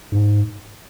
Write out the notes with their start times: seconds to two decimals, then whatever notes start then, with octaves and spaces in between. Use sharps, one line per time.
0.12 G#2